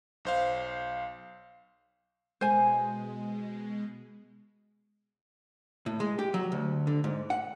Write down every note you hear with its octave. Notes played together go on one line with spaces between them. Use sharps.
B1 C5 F5
B2 G#3 C5 G#5
A2
G#3
G4
F#3
D2
D3
G#2
F#5